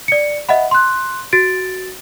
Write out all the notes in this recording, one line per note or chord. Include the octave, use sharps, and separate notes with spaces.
D5 C#7
D#5 E5 F#5 B5
C6 F#6
F#4 A6 D7